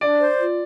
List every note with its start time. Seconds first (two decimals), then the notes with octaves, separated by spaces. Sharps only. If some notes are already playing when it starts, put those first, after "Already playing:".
0.01 D4 D5
0.20 C5
0.39 F4